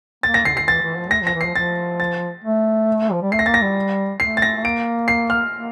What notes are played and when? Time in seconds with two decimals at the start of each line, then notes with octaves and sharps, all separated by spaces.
0.23 A#3 A6
0.34 A#6
0.45 D3 C7
0.54 C3
0.57 C7
0.60 D3
0.68 E3 A6
0.82 E3
0.97 F3
1.11 A3 A#6
1.22 F3 A#6
1.34 E3
1.41 F3 C7
1.55 F3 A6
2.00 A6
2.44 A3
3.12 F3
3.22 G3
3.32 A3 C7
3.39 A#6
3.46 A#3 A6
3.54 A#6
3.62 G3
4.20 A3 C7
4.37 A6
4.42 A#6
4.57 A3
4.64 A#3 D7
5.08 C7
5.30 F6
5.53 A#3